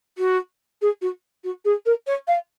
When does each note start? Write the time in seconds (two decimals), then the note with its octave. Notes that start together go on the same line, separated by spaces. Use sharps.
0.18 F#4
0.81 G#4
1.01 F#4
1.44 F#4
1.65 G#4
1.86 A#4
2.07 C#5
2.27 F5